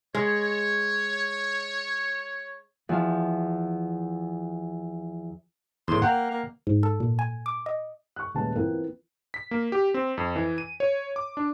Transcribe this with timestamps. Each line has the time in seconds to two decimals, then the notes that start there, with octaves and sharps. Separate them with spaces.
0.15 G#3 C#5
2.89 E2 F3 F5
5.88 E2 A2 C6
6.02 A#3 F#5 G5
6.31 A#3
6.67 G#2
6.83 A4
7.00 A#2
7.19 G#5
7.46 D6
7.66 D#5
8.16 C#6 F#6
8.34 D#1 C#3 G#3 A3 B4 A5
8.56 E3 B3 C4 E4 F4 A#4
9.34 B6
9.51 A#3
9.72 G4
9.94 C4
10.18 F2
10.36 E3
10.58 D#7
10.80 C#5
11.16 D6
11.37 D4